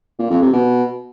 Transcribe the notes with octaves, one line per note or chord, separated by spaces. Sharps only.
A#2
F2
C3
B2